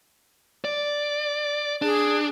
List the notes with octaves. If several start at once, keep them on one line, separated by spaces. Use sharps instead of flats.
D5
D4 G#4